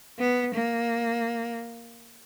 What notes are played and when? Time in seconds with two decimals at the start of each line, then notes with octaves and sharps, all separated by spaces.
0.19 B3
0.54 A#3